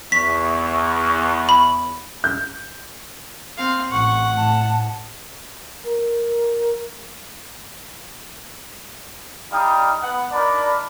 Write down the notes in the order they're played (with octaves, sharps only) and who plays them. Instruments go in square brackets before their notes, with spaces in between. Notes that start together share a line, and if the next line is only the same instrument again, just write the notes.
[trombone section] E2 [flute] C#6 [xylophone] B6
[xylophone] B5
[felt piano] G6
[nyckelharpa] C4 F5
[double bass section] A1 [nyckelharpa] F#5 [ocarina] C#6
[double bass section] A2 [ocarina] A5
[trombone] A#4
[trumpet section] G3 D4 D#4 F5 G5 D#6
B3 F#5
D4 D#4 A#4 D5 B5